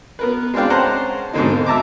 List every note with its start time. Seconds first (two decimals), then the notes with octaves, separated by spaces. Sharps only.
0.19 B3 A#4 B4
0.54 G#3 C4 D4 F5 G5
0.70 C#4 C5 F#5 A5 A#5 C6
1.33 G#2 B2 D3 C4 D#4
1.51 A#3
1.66 E5 A5 A#5 D6